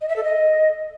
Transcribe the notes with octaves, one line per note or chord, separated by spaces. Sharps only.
D#5
E5
A4
D#5